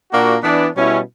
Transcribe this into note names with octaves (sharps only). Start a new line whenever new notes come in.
A#2 A#3 D4 F#4
E3 B3 D4
B2 G3 C#4 E4